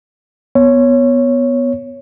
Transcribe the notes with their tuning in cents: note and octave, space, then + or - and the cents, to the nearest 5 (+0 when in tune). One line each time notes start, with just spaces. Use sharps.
B3 +0 C#5 +0